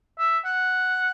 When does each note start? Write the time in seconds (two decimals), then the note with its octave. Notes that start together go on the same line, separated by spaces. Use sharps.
0.19 E5
0.45 F#5